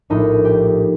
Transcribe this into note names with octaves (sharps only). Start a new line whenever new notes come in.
A#1 A2 D#4
G4